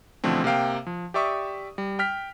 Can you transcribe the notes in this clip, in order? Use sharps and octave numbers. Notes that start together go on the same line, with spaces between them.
B2 D3 E3 F3 A3 C4
C3 A#3 F5 G5
F3
G4 D5 E5 C#6 D#6
G3
G5 F6 B6